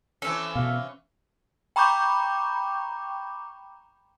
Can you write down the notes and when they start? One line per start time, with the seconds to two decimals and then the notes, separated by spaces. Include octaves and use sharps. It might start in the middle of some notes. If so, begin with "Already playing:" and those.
0.22 E3 C4 C#4 A4
0.55 B2 F5
1.76 G5 A#5 B5 C#6 D6 G6